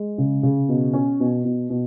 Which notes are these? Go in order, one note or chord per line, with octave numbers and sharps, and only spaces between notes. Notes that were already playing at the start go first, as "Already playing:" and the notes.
Already playing: G#3
C#3
C#3
B2
C#4
B2
B2
B2